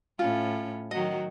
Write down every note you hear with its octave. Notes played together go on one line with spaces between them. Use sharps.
A2 C#4 F4
D#3 F#3 F#4 D#5